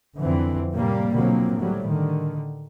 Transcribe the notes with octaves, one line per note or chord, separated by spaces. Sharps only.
F2 D3 E3 C4
A2 C3 G3 A#3
B2 D3 F3 F#3 A#3 C4
A2 F#3 G3
D3 D#3